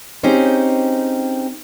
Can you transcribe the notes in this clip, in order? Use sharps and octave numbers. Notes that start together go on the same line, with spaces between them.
C4 C#4 D#4 G4 G#4 C5